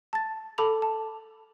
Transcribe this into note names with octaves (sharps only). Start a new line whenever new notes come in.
A5 A6
A4 A5 B5 D6 F7 F#7
A5